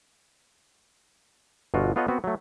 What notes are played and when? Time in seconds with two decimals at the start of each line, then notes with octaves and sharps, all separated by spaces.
1.74 G1 B2 F4 F#4
1.96 B3 F4 A4 C#5 D#5 F#5
2.08 B3 C4 F#4
2.24 F#3 A3